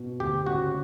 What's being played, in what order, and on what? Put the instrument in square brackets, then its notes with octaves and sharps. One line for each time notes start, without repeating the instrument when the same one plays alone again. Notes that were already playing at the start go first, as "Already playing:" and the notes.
Already playing: [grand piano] B2
[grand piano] D2 [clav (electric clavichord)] G4
[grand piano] C#3 [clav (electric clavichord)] F#4